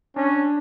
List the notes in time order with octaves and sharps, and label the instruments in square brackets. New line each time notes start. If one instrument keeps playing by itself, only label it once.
[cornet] C#4 [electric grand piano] D4